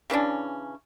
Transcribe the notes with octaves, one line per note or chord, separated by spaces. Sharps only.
C#3 E3 C#4 D4